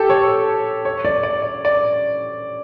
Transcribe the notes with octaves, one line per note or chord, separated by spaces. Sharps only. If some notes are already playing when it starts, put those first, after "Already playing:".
Already playing: G4 A4
C#5
C#5
D5
D5
D5
D5